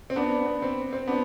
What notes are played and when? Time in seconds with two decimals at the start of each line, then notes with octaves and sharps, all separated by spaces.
0.10 C4
0.16 B3 D4
0.46 B3
0.62 C4
0.93 C4
1.07 B3 D4